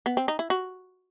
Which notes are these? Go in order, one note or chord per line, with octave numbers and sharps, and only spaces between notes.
B3
C4
D#4
E4
F#4